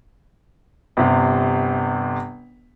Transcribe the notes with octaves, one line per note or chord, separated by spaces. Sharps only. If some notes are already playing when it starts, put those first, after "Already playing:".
G1 C3